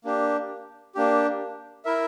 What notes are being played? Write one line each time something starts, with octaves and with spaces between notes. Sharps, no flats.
A#3 D4 G4
A#3 D4 G4
E4 A#4 E5